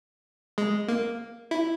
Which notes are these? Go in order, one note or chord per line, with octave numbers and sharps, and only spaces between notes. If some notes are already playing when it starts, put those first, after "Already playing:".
G#3
A#3
E4